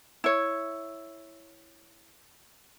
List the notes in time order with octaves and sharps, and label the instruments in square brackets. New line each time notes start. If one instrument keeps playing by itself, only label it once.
[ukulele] E4 C#5